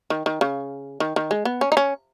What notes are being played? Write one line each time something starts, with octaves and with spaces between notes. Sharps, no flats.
D#3
D#3
C#3
D#3
D#3
G#3
B3
C#4
D#4
C#4